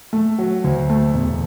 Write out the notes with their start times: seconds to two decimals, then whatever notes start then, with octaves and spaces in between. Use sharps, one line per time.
0.13 A3
0.39 F#3
0.64 D2
0.90 A3
1.14 E1